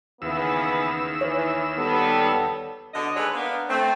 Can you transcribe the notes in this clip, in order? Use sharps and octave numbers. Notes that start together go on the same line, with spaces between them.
D#2 C#3 E3 B3 E6
E3 C#5
G3 B3 A4
B2 D3 D4 D#5
D#2 G#3 A4 B4 C#5 D5
A#3 B3 D4
A3 C4